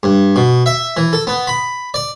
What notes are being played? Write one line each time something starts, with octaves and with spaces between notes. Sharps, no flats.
G2
B2
E5
E3
A4
B3
B5
D5